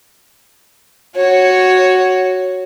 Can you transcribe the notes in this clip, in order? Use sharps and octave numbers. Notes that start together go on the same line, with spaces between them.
F#4 C#5